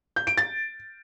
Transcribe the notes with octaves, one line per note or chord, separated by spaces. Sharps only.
G6
D7
A6